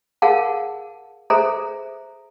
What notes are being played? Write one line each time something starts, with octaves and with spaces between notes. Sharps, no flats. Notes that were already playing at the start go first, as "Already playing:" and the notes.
G#4 A#4 F5 F#5 A5
G#4 A4 C5 E5 A#5